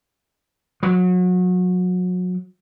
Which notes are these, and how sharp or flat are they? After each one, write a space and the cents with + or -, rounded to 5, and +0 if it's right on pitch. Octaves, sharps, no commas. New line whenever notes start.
F#3 -30